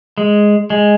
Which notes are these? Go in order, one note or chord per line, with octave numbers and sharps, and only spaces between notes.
G#3
G#3